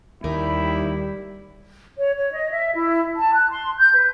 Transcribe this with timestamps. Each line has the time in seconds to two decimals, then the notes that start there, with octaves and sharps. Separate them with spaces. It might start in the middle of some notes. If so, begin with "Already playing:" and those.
0.24 D#2 G3 D#4 E4 A#4 D5
1.97 C#5
2.17 C#5
2.33 D#5
2.50 E5
2.75 E4
3.17 A5
3.34 F#6
3.50 C6
3.77 G6
3.93 B4